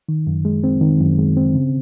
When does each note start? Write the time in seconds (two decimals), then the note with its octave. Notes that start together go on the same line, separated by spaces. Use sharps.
0.09 D#3
0.27 F#2
0.45 G#3
0.64 C4
0.81 D#3
1.00 F#2
1.18 G#3
1.37 C4
1.55 C#3